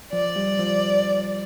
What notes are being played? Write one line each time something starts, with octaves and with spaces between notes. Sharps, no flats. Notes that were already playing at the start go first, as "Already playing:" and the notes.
F3 D5
G3
F3